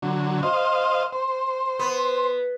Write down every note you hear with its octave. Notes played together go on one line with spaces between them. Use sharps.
D3 F#3
C5 D#5 F5
C5
B3